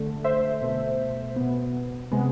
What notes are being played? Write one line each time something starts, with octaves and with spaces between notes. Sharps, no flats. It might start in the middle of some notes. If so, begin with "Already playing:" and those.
Already playing: D3 A3
C5 E5
B2 A3
B2 B3
C3 G#3 B3